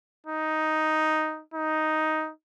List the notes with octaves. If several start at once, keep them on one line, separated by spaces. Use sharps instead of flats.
D#4
D#4